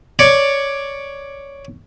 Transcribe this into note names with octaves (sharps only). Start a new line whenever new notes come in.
C#5 D5